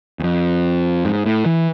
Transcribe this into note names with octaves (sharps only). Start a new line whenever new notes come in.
E2
F2
G#2
A2
E3